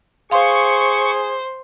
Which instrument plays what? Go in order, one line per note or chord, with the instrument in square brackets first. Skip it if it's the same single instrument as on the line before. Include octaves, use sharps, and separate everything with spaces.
[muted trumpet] G#4 [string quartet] C5 [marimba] F5 C6 [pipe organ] C#6